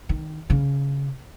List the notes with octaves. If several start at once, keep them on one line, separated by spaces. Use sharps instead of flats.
D#3
C#3